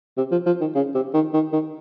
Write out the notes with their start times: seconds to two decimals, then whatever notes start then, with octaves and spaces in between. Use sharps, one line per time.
0.17 C3
0.31 F3
0.46 F3
0.60 D#3
0.75 C#3
0.94 C3
1.14 D#3
1.33 D#3
1.53 D#3